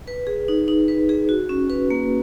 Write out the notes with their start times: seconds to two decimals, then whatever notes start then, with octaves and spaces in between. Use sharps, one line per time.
0.07 B4
0.27 G#4
0.48 D#4
0.68 D#4
0.88 B4
1.09 G#4
1.29 F#4
1.49 C#4
1.70 B4
1.90 A#3